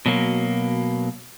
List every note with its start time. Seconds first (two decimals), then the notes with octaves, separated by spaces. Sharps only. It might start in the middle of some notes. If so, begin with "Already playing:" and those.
0.06 B2 F#3 A#3